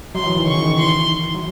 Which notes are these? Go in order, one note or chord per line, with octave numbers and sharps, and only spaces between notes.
F#3 C6
E3
D#3
C#3 C#6
D#3
E3
C6
F#3